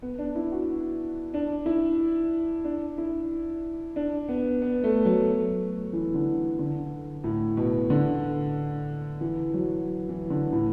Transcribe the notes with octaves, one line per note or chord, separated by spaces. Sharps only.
B3
D4
E4
F#4
D4
E4
D4
E4
D4
B3
B3
A3
F#3
E3
D3
D3
A2
B2
D3
E3
F#3
E3
D3
A2